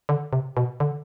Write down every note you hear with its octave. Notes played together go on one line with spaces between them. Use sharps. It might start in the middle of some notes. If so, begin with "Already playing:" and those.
D3
C3
B2
D3